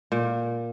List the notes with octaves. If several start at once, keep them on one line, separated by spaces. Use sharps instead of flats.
A#2